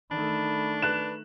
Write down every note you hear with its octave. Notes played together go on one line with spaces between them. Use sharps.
D#3 A3 D4 B5
B4 F#6 E7